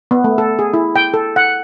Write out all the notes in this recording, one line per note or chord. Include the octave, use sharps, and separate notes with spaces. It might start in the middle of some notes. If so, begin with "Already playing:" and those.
B3
A3
A4
G#4
E4
G5
A4
F#5